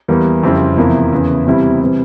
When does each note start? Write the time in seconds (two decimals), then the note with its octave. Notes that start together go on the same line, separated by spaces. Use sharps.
0.08 E2 E3 G3 A#3
0.43 F2 C#3 G3 C4 E4
0.77 E2 C3 F3 A#3 E4
1.12 E2 C#3 E3
1.46 E2 C3 G3 C4 E4
1.81 C3 E3 G3 C4 E4